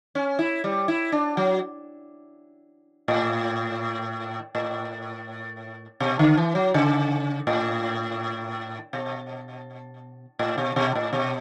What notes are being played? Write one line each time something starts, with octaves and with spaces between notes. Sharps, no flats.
C#4
E4
G3
E4
D4
F#3
A2
A2
B2
D3
E3
F#3
C#3
A2
B2
A2
B2
B2
A2
B2